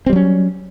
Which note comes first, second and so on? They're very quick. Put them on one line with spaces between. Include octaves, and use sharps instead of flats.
C4 G3 F#3 C#4